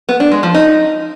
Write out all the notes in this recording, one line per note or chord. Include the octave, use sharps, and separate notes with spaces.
B3
D4
G#3
F3
D#4